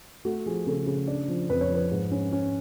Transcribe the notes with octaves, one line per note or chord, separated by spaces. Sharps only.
A3 F#4
F3 G#4
C#3 A4
C#3
D4
F3
F2 B4
C#5
F3 B4
G#2
C#4
C#4